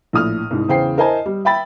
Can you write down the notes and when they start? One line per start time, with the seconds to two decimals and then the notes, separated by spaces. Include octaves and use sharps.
0.13 A#1 A2 D#6 F6
0.51 C2 G#2
0.68 E2 C#3 C5 G5 C7
0.97 E4 A#4 C5 D#5 G#5 A5
1.26 G3
1.45 E5 G5 B5 A6